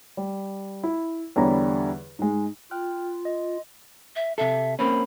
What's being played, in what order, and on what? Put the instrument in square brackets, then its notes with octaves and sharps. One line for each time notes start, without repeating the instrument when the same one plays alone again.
[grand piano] G3
E4
E2 D3 G3 C#5 A#5 B5
G#2 G#3
[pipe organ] F4 [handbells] G5 F6 F#6
[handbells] D#5
[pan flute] E5
[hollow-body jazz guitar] C3 A4 [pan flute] E5
[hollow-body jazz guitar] A#3 C4 C#4 [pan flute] B5